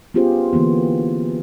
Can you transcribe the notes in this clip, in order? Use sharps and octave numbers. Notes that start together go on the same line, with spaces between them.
B3 C#4 F4 G4 G#4 C5
D3 E3 A#3 B3